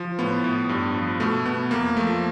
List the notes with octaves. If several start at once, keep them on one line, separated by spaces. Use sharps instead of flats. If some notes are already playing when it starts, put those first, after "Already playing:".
Already playing: F3
A2 B3
A2
G2
F3
B2 A3
B2 B3
F2 A#3
F3 A3